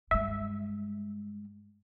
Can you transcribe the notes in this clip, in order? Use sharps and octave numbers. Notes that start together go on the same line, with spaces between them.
G2 G#3 E5